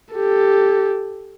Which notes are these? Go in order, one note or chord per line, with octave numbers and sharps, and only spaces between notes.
G4 A4